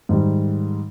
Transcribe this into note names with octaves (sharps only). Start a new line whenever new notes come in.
G#2 D#3 G3